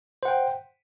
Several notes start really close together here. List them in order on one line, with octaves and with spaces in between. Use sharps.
C5 F#5 G5